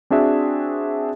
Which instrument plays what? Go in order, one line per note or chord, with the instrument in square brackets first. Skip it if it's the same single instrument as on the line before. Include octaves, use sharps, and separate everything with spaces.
[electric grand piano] C4 D4 F#4 G#4 E5